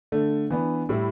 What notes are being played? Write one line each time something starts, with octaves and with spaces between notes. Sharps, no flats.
D3 A3 D4
E3 B3 D4
A2 G3 E4